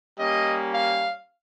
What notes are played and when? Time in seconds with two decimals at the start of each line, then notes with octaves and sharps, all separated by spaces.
0.18 G3 A#3 C#4 D#5
0.74 F5